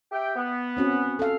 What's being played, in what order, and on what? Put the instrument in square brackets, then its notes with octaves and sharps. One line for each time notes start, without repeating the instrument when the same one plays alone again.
[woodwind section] G4 E5 G5
B3
[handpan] C4 C#4 F#4
A4 F5